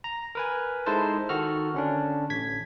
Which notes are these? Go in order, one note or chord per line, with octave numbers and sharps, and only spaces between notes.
A#5
A#4 B4 G#5
G#3 D#4 E4 A4 C5 A5
D#3 F#4 A4 F6
D3 C#4 D4
A1 G#6 B6